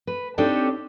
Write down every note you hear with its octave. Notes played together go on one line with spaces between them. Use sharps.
B4
C4 D4 D#4 G4 A4 C#5